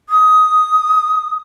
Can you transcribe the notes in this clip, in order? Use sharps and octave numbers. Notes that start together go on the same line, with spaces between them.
D#6